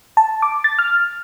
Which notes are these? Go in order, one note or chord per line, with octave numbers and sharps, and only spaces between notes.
A5
D6
A6
F6